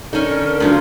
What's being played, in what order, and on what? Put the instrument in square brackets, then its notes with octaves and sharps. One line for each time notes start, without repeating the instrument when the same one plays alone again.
[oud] D3 [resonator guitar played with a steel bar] C#4 D#4 [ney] A#4
[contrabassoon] D2 [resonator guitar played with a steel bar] G2 C#3 F3 [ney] A#5